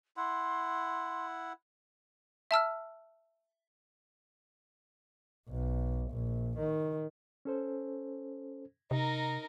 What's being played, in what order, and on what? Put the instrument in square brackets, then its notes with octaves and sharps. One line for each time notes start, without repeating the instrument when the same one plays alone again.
[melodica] E4 F#5 [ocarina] C6
[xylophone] E5 A5 E6 F6
[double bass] B1
A#1
D#3
[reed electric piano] C#4 A4 C5
[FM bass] C3 [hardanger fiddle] D#4 A#4 [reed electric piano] D#5